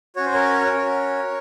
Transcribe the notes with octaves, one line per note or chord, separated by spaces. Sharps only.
C#4 F#4 C#5
C5
A#4 C#5
C#4 F#4